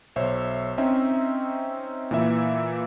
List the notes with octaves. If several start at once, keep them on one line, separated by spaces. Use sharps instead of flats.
B1 C5 C#5 E5
C4 C#4 D#4 E5
A#2 E3 E5